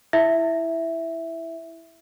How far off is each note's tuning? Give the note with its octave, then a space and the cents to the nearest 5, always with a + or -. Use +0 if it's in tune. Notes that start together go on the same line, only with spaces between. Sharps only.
E4 +0 E5 +0